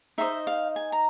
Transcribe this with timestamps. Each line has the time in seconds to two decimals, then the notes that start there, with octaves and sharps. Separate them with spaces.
0.18 D#4 G#4 C5 D#5 E5
0.47 F5
0.76 G#5
0.92 A#5